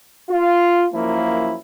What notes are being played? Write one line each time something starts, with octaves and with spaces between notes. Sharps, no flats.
F4
F#2 F3 A#3 E4